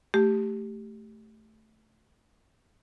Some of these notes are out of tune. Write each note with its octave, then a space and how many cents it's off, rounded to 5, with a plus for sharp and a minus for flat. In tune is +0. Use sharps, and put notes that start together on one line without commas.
A3 +0 G4 +0